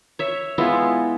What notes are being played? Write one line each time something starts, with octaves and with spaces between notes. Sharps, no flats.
C#5 E5
G#3 B3 E4 F4